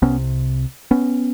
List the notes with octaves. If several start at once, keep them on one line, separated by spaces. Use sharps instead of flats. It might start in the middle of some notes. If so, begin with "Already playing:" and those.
C2 C3 B3 C#4
B3 C#4